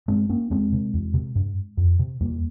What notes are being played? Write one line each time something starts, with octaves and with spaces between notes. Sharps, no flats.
G2 G#3 C4
A#3 C#4
E2 G#3 C4
C3
E2
C3
G2
F2
C3
E2 G3 A#3